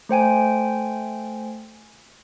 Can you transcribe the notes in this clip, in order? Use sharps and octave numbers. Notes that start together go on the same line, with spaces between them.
A3 C5 G5 G#5